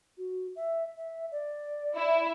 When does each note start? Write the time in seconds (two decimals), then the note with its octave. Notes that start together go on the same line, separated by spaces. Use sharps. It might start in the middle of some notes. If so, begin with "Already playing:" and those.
0.18 F#4
0.56 E5
0.97 E5
1.32 D5
1.97 E4